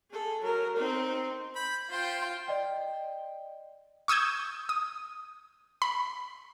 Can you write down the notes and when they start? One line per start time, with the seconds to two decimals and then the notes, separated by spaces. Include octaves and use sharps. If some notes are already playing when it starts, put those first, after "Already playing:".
0.11 G#4 A4
0.41 F#3 A#4
0.76 C4 D#4
1.55 B5 G6
1.90 F4 C5 G5
2.48 D5 D#5 G5
4.08 C#6 D#6 E6 G6 G#6
4.69 D#6
5.82 B5